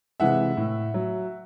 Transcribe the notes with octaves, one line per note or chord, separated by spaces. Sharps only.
C3 E3 G#3 E5 F#5
A2
F#3